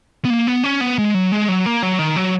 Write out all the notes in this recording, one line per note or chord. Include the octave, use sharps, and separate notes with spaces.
B3
A#3
B3
C#4
B3
G#3
F#3
G#3
F#3
A#3
F#3
D#3
F#3